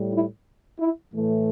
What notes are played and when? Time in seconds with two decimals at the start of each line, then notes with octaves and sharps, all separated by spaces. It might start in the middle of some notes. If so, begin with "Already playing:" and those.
Already playing: A2 G3
0.14 E4
0.80 E4
1.13 A2 E3 A3